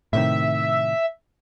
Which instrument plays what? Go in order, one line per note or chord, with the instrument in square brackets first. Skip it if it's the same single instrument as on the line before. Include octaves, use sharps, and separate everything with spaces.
[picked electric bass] A2 C3 D#3 [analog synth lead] E5